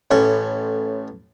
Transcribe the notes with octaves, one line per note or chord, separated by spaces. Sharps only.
A1 A2 C#4 C#6